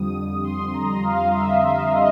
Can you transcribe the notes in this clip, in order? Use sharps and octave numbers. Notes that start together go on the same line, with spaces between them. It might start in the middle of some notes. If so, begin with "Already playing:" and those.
Already playing: F2 D3 G3 D#6
C6
A#5
F5
E5
E5
D#5